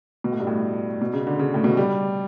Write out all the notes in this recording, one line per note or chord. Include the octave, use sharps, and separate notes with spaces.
B2
A2
G2
A2
B2
C#3
D3
C#3
A2
B2
G3